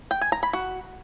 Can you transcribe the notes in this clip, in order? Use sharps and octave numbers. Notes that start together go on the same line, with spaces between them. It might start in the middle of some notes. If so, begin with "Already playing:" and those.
G5
G#5
A#5
B5
F#4